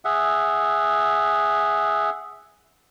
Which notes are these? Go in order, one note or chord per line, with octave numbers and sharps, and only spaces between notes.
G#4 E5 F#5